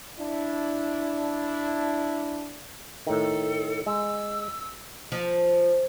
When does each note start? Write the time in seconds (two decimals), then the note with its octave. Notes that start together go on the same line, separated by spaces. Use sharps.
0.19 D4 E4
3.07 A2 D#3 A4
3.86 G#3 E6
5.12 F3